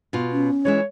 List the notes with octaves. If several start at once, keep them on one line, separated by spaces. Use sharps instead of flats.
B2 F4
C#4
E3 G#3 E4 C#5